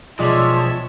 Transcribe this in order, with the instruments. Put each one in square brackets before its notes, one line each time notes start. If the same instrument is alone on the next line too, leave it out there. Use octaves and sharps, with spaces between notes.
[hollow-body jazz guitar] B1 [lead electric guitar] F3 [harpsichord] G3 G#3 D4 [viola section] C#5 E5